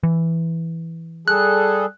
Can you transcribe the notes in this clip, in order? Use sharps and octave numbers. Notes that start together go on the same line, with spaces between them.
E3
G3 G#4 A4 F#6